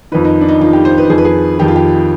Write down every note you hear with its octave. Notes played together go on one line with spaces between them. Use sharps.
F2 D#3 B4
D#4
D4
D#4
F2 D#3 F4
G4
C5
B4
F2 D#3 G#4 B4
G#4
F2 D#3 G4
F4
G4